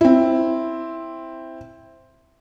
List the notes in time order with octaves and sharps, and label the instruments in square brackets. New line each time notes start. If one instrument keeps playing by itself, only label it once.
[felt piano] C4 E4